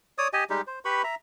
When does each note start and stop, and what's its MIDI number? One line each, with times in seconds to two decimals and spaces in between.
0.18 0.28 73
0.18 0.28 74
0.18 0.28 87
0.33 0.44 67
0.33 0.44 75
0.33 0.44 80
0.50 0.61 55
0.50 0.61 56
0.50 0.61 63
0.50 0.61 67
0.67 0.79 72
0.85 1.02 67
0.85 1.02 71
0.85 1.02 83
0.85 1.02 85
1.04 1.15 76
1.04 1.15 82